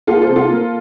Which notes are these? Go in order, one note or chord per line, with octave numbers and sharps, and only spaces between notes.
A#3 F4 A4
A4 C5
C3
F4 A4
A#3